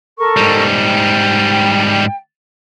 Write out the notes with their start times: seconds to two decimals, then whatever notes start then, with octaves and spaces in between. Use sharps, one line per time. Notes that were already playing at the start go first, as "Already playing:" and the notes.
0.18 A4 A#4 C#6
0.37 G#2 G3
0.85 G5